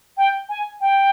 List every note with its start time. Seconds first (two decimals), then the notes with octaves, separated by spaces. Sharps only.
0.17 G5
0.49 G#5
0.81 G5